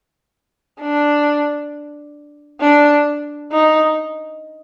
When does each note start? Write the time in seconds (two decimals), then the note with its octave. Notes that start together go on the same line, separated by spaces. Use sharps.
0.80 D4
2.61 D4
3.52 D#4